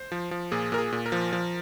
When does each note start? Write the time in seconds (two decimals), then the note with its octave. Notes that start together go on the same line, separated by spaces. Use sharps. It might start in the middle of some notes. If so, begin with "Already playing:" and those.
Already playing: C5
0.12 F3
0.31 F3
0.52 A#2 G#4
0.72 A#2 A#4
0.78 G#4
0.92 A#2
1.06 A#4
1.12 F3
1.33 F3